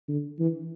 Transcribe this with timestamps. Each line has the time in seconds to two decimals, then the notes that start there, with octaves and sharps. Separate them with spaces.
0.09 D3
0.39 E3